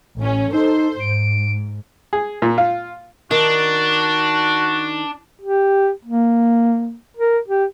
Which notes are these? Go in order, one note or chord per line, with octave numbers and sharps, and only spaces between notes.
A1 C#4
D#4 A4 C5
G#2 D7
G#4
A#2
F4
D#3 D4 F#4
G4
A#3
A#4
G4